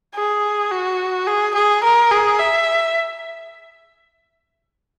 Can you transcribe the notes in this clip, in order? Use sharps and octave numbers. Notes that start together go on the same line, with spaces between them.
G#4
F#4
G#4
G#4
A#4
G#4
E5